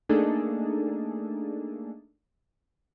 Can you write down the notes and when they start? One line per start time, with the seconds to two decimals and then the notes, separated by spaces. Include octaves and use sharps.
0.09 A3 A#3 D4 D#4 G#4 A4